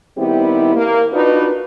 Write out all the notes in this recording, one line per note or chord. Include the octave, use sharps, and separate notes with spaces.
D#3 G3 B3 C4 E4 G4
A#3
D4 D#4 F4 F#4 B4